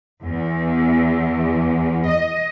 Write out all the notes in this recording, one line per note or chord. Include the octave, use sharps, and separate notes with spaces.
E2
D#5